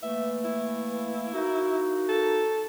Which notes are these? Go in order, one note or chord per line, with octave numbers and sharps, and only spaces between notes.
E3 A3 A#3 E5
E4
A#3 D#4 F#4
A4